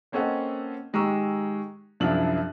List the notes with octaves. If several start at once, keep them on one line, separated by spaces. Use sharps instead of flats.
A#3 C4 C#4 A4 D#5 F#5
D#3 G#3 G4 A#5 C#6 E6
C2 F#2 F3 D4 E4 F#7